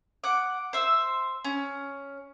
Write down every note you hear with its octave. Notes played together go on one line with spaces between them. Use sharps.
F#5 D6
C5 E5 E6
C#4